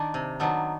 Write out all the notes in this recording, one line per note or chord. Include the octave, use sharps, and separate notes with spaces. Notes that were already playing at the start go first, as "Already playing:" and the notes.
Already playing: D#3 D4
C3
D#3 F#3 B3 D4